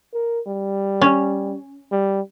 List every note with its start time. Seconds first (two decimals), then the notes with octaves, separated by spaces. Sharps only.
0.14 A#4
0.47 G3
1.01 C#4
1.92 G3